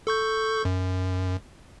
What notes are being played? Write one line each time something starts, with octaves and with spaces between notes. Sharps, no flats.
A4 C#6 G6
F#2